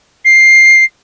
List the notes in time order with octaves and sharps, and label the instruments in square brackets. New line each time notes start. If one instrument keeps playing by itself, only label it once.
[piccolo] C7